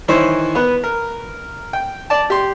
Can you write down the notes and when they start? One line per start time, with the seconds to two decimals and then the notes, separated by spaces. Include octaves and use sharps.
0.08 D#3 E3 E4 C5 C#5
0.55 B3 B4
0.84 A#4
1.73 G5
2.10 D5 A5
2.30 G4 C6